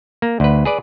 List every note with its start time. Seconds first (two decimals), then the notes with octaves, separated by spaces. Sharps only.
0.22 A#3
0.40 D2 B4
0.65 G#4 B4 D5